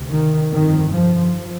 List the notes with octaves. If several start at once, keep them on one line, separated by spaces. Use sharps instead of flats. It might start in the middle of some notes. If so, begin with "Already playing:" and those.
Already playing: D2 C3
D#3
G1 F2 C3 D#3
F3